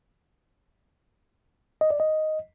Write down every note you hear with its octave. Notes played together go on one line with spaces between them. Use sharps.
D#5
D5
D#5